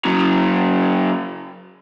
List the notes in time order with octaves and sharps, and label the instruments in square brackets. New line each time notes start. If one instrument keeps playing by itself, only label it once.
[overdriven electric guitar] C#3 F#3